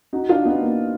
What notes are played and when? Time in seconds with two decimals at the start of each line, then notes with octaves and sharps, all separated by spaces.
0.13 D#4 F#4
0.29 D4 F4
0.45 B3 D#4
0.62 A#3